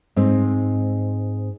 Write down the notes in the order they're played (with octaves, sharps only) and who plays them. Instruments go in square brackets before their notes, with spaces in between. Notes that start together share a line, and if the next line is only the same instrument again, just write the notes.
[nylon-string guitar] G#2 C4